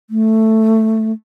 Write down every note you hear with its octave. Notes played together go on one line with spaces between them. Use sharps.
A3